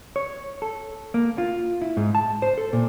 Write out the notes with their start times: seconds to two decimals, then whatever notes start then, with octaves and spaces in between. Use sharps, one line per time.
0.16 C#5
0.62 A4
1.14 A#3
1.38 F4
1.82 E4
1.97 G#2
2.15 A5
2.42 C5
2.58 A4
2.73 A#2